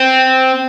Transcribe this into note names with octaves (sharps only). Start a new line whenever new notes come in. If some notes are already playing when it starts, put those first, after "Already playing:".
Already playing: C4